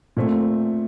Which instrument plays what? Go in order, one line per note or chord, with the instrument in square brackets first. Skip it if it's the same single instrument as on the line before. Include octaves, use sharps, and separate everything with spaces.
[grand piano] A#2 A3 C4